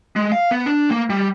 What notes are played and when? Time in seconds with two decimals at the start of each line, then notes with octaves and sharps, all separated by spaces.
0.16 G#3
0.32 F5
0.51 B3
0.66 D4
0.90 A#3
1.10 G3